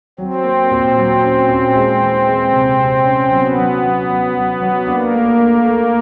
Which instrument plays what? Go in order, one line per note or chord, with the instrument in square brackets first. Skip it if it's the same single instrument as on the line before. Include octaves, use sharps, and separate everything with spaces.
[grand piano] F#3 [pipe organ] C4
[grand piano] A#3
A#2
F#3
C#4
A#2
G#3
E3
G#3
C3
C3
C#4
[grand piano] F#3 [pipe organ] B3
[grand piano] F#3
F#3
F#3
F#3
F#3
[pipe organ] A#3 [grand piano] D4
[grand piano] A3
A3
A3